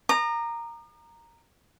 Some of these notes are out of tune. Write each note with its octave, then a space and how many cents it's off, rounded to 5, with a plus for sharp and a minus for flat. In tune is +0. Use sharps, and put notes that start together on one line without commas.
A#5 -5 D#6 -45